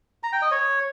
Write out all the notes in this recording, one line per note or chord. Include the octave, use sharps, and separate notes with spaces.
A#5
G5
D#5
C#5